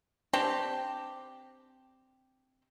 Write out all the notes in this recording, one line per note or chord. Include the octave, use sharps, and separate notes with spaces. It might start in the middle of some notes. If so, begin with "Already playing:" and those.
C4 D4 G4 G5